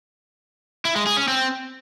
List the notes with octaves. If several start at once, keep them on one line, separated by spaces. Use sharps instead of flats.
E4
G#3
G#4
C#4
C4